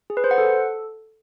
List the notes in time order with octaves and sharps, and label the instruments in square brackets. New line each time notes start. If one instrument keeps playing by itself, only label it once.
[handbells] G#4
B4
C5
F#5
A4